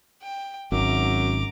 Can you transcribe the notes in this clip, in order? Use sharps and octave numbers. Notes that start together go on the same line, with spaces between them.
G5
G#1 F#2 A#5 D6